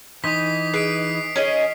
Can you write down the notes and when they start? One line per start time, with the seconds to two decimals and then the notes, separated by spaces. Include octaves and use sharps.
0.24 E3 D#4 C6 D#6 B6
0.74 G#4 B4 C7 D7
1.36 C#4 G#4 C#5 D#5